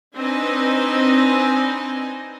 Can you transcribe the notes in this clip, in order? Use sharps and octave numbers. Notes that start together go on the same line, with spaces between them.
C4 D4 D#4 B4 D#5 G#5